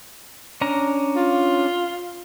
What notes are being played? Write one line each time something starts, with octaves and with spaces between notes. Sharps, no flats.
C#4 D4 A#5
F4